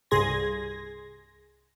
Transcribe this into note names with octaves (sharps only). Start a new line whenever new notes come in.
C2 G2 G#4 C6 G#6 A#6